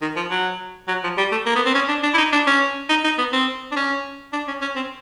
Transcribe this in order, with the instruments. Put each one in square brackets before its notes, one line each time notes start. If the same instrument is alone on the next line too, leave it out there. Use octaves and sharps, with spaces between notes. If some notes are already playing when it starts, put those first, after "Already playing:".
[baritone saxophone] D#3
F3
F#3
F#3
F3
G3
A3
A#3
B3
C4
C#4
D4
D4
E4
D#4
D4
C#4
D#4
D#4
B3
C4
D4
C#4
D4
C#4
C#4
C4